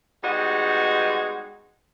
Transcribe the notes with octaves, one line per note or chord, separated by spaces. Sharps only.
G3 G#3 B3 D#4 F#4 D#5